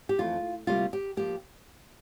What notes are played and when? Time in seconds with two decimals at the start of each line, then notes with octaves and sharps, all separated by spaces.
0.09 G4
0.19 F2 E3 A3 F4
0.67 D2 C3 G3 A#3 F4
0.93 G4
1.17 F3 A#3 G4